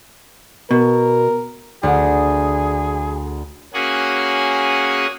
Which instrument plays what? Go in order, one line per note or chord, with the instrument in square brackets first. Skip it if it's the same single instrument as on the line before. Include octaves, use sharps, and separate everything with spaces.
[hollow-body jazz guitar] B2 [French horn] A#4
[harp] D2 [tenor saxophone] G#4
[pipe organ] A#3 C#4 F#4 G#4 F#5 G#5